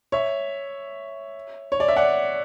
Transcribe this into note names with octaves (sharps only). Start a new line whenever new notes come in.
C#5 E5
C#5
D5
E5
D5 F#5